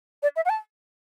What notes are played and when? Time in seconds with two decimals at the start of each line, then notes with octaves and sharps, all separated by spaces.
0.23 D5
0.36 E5
0.45 F#5
0.49 A5